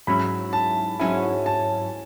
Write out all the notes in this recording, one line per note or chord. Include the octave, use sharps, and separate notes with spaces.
G#2 F#3 C#4 E4 B5
A5
G#2 F#3 C#4 E4 G#5
A5